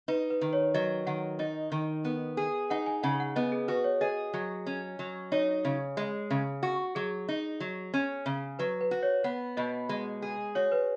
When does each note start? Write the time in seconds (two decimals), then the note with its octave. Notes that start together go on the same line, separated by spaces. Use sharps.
0.08 D#4 B4
0.30 B4
0.41 D#3
0.53 C#5
0.74 F#3 D#5
1.07 D#3 F#5
1.39 D#4 D#5
1.72 D#3
2.05 B3
2.37 G#4
2.70 D#4 F#5
2.86 G#5
3.03 C#3 F#5
3.20 F#5
3.36 B3 D#5
3.52 G#4
3.68 F#4 B4
3.84 C#5
4.01 G#4 D#5
4.34 F#3
4.67 C#4
4.99 F#3
5.32 D#4 C#5
5.65 C#3
5.97 G#3
6.31 C#3
6.63 F#4
6.95 F#3 G#4
7.29 D#4
7.60 F#3
7.94 C#4
8.26 C#3
8.59 F#3 B4
8.81 B4
8.91 F#4
9.03 C#5
9.24 B3 F#5
9.57 B2 D#5
9.89 G#3
10.22 G#4
10.55 F#4 C#5
10.72 B4